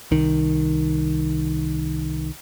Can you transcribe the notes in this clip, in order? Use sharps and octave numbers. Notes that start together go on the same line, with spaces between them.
C2 D#3